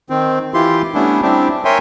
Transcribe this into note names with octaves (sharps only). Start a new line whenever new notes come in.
D#3 C4
E3 E4 F4 G4 C6
G3 A3 B3 C#4 D4 E4
G3 C4 D4 E4 G4
A#4 C#5 E5 G5 G#5 C6